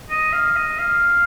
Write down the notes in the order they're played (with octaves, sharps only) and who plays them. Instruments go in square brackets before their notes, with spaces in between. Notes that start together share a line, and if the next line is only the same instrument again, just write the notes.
[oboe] D#5
F5
D#5
F5